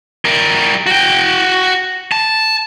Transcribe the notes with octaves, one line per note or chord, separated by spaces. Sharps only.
G3 A#4
F#4 G5
A5